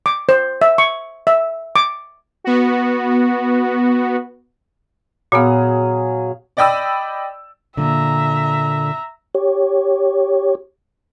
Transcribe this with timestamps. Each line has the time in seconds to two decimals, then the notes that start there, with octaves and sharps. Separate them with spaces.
0.06 D6
0.29 C5
0.62 E5
0.78 C#6
1.27 E5
1.76 D6
2.44 B3 F#4
5.32 A#2 F#3 B3 G#4 F5
6.57 D5 D#5 G5 B5 D#6 E6
7.77 A#2 D3 E5 A#5
9.35 G4 C#5